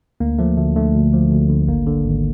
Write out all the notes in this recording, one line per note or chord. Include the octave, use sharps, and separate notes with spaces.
D2 A#3
F3 A3
D2 A3
D3 A3
D2
F3
D2
D3
G#1 A#3
D3
G#1